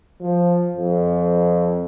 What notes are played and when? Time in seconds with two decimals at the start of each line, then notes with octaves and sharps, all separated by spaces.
0.21 F3
0.77 F2